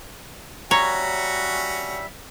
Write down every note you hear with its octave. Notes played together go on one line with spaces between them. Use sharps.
G3 C#4 F#4 C#5 E5 A#5